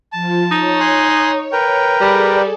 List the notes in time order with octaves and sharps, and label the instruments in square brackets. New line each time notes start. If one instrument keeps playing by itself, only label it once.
[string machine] F3 F4 [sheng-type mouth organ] A5
[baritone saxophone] D#4 [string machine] C#5
[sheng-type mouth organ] G#5 C6 F#6
A#4 B4 G5
[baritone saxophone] G3 [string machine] G#4 A4 D5